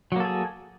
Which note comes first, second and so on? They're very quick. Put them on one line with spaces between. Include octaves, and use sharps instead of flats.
F#3 A#3 A4 G#4